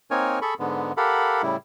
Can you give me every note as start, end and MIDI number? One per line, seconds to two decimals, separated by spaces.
0.11 0.39 58
0.11 0.39 60
0.11 0.39 63
0.11 0.39 70
0.11 0.39 73
0.11 0.39 80
0.42 0.54 68
0.42 0.54 69
0.42 0.54 83
0.42 0.54 85
0.59 0.92 44
0.59 0.92 50
0.59 0.92 56
0.59 0.92 59
0.97 1.42 67
0.97 1.42 69
0.97 1.42 70
0.97 1.42 77
0.97 1.42 78
0.97 1.42 83
1.43 1.57 45
1.43 1.57 49
1.43 1.57 55
1.43 1.57 64